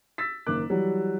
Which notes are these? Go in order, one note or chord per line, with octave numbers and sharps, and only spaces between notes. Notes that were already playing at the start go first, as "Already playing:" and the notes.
E6 A6 B6
F#1 D#3 A#3 D6 F#6
E3 F#3 G3